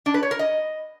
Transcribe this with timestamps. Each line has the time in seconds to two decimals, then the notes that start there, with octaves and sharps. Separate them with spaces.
0.06 D4
0.14 B4
0.23 C#5
0.31 A#4
0.39 D#5